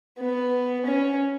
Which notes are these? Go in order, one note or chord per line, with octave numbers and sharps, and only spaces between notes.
B3
C#4